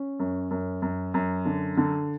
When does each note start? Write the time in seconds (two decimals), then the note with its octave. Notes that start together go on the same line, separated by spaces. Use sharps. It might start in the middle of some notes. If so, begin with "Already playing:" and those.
Already playing: C#4
0.20 F#2
0.51 F#2
0.82 F#2
1.14 F#2
1.45 D3
1.77 D3